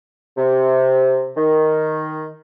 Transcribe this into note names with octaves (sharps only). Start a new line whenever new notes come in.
C3
D#3